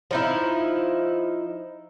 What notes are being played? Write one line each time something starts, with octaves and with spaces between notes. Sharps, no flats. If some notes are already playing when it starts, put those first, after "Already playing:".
F3 D#4 E4